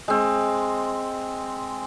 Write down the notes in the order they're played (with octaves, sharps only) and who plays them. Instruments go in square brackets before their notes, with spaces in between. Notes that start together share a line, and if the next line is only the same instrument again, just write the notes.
[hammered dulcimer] G#3 C4